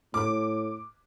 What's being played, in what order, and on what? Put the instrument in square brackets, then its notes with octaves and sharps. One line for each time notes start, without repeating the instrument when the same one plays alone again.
[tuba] A2 [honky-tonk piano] D6